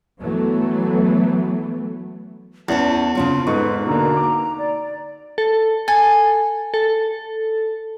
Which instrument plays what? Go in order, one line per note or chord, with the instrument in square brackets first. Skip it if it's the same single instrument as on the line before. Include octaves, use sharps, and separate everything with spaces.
[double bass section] E3 F#3 A3 B3
[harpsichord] E2 [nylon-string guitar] C#4 C5 F#5 [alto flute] A5
[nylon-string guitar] C#3 C4 C#4 [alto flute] F4
[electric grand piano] G#2 A4 C#6 [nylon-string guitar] D#4 [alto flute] B4
[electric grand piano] B2 D3 A#3 [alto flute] A#5
[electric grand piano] D6
[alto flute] D5
[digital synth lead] A4
[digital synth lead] A4 [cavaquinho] G#5
[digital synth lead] A4